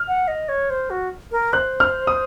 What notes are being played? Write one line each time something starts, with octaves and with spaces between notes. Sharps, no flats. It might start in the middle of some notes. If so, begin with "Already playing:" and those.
Already playing: F6
F#5
D#5
C#5
C5
F#4
A#4
C5 F#6
F6
D#6